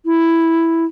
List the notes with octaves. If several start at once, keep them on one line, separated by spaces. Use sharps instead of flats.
E4